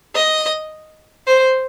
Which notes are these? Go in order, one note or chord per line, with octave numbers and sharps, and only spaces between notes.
D#5
C5